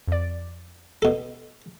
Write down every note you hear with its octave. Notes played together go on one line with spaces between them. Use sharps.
F2 D5
B2 A4